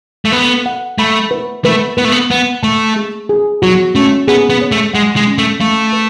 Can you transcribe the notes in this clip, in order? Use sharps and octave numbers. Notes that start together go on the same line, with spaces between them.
A3
B3 A4
F#5
A3 B5
B4
A3 B4
B3 B4
A3
B3
B3 F#5
A3 A5
G#4
G#4
F#3 F#4
A3 C#4
B3 G#4
B3
C#5
A3
G#3 F#5
G#3
C#4
A3
A3 F5
B4